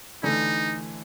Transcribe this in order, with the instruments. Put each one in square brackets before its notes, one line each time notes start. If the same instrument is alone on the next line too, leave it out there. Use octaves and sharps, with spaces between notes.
[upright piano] D3 E3 A3 [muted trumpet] D#4